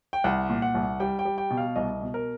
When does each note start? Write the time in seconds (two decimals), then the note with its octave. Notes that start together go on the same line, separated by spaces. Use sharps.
0.13 G5
0.24 C2 F#5
0.50 A#2
0.62 F#5
0.75 C2
1.00 G3 G5
1.19 G5
1.25 G3
1.38 G5
1.51 B2
1.58 F5
1.76 C2 D#5
2.02 B2
2.14 A#4